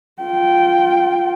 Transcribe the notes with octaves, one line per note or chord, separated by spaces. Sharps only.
F4 G5